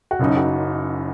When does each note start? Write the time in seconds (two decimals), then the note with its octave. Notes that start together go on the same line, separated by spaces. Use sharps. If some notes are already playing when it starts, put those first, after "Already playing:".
0.11 F#4
0.19 F#1 F#2 C#3 D#4
0.37 F#4